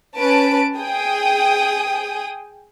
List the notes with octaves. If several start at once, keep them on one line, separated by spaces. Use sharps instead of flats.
C#4 B4 A5 D7
G#4 G5 D#6